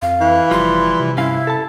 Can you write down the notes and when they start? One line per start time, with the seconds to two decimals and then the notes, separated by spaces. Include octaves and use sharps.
0.02 F2 F5
0.21 E3
0.51 F1 F3 G3 C6
1.00 C3
1.17 G2 C#4 E4 F5
1.47 A4 A5